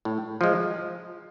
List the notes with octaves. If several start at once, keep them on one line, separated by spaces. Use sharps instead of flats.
A2
F3 G#3